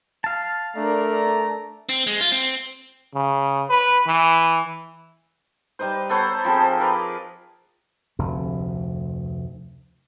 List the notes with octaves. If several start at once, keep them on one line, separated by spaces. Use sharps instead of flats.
F5 A5
A3 D4 A#4 D5 A#5
C4
G#3
F4
C4
C#3
B4
E3
G3 D#4 B4 C5
B3 A4 C5 C#5
F3 C4 G#4 A4
A#4 B4 D5 D#5
F1 D2